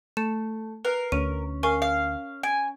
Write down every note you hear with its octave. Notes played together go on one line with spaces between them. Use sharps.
A3 E7
A#4 B4 C7
D2 C#4 D#7
A#4 F5 G#5 C#6
F5
G#5 D7